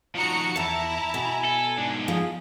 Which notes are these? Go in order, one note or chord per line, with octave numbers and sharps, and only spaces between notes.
F3 D#4 F#4 A#5 C#7
E2 E4 E5 A5 A#5
B2 G#5
A4
G#2 D4
F3 G#4